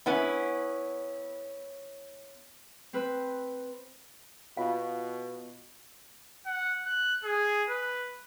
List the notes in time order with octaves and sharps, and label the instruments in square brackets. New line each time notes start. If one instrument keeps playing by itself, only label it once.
[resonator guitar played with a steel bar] B3 C#4 E4
[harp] C4 B4
[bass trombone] B2 [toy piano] F4 F5
[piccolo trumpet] F#5
F#6
G#4
B4